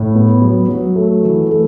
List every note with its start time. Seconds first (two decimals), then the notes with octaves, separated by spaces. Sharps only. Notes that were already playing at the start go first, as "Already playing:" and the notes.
Already playing: A2
0.15 B3
0.42 F#3
0.68 F#3
0.96 A3
1.22 E3
1.49 A3